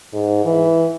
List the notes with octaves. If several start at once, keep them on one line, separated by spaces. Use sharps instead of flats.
G#2
E3